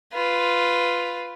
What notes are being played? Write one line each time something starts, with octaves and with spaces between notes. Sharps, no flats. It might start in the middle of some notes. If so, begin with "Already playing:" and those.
F4 B4